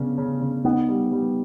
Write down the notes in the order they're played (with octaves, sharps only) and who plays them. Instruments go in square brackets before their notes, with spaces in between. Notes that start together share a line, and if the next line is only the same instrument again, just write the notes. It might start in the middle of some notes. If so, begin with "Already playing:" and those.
Already playing: [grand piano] C#3 C#4 D4 [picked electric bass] B3
[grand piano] C#3
C#3
[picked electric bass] B3 [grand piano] D#4
[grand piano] G3
G3